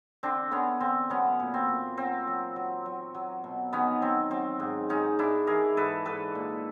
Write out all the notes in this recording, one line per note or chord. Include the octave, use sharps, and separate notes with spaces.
D3 C4 D4
D3 B3 C#4
D3 C4
F#3 B3 C#4
A#2
C4
A#2
F#3 C4
F#3
F#3
F#3
F#3
B2
D#3 B3 C#4
F#3 C4
F#3 C4
G#2
G#2 C#4 D#4
G#2 D4 E4
E3 G#4 A#4
G#2 A4 B4
G#2 A4 B4
A#2